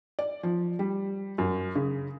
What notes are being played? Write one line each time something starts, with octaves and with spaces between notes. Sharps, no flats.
D5
F3
G3
F#2
C#3